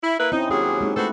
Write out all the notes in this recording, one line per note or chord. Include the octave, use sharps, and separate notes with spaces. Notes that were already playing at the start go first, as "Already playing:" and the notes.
E4
A#3 E4 B4
C4 C#4 D#4 E4
D#2 F#3 C#4 G4 G#4
G#3 C4 D#4
A3 F#4 A4 B4 C5